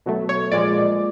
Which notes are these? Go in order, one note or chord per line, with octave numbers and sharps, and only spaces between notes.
B2 F#3 A3
C#5
A#2 F3 G#3 D5